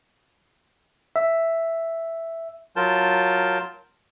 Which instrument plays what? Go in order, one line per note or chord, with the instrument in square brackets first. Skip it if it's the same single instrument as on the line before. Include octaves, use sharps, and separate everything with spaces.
[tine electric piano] E5
[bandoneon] F#3 F4 A#4 A5 G6